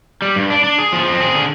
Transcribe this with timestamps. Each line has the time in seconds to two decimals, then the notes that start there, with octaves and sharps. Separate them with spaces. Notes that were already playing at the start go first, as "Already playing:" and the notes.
0.22 G3
0.36 G2
0.50 D4
0.64 D4
0.79 G#4
0.93 F3
1.06 C4
1.20 G#4
1.35 D3